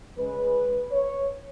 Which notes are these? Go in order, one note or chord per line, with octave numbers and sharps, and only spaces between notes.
C#3 G#3 C#4 B4
C#5